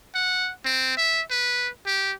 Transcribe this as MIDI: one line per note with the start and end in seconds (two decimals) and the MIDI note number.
0.15 0.51 78
0.65 0.96 60
0.97 1.22 76
1.31 1.69 71
1.86 2.12 67